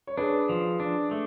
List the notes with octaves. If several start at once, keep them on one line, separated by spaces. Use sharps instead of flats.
C#5
D4 G#4 B4
F3
D4
A3